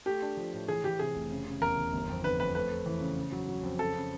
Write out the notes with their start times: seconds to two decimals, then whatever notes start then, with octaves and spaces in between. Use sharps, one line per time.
0.06 A3 G4
0.22 D4
0.37 F3
0.53 A2
0.68 E3 G#4
0.84 E3 G4
0.99 C3 G#4
1.15 F1
1.31 C#3
1.46 C#3
1.61 E2 A#4
1.77 E2
1.93 G1
2.09 F2
2.24 D3 B4
2.40 F2 B4
2.55 A3 B4
2.71 A3
2.86 E3
3.01 C#3
3.17 C#3
3.32 F#3
3.48 F#3
3.63 F2
3.79 C#3 A4
3.95 C#3